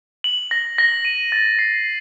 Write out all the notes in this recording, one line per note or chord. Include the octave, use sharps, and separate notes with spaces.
F#7
A#6
A#6
D#7
A6
C7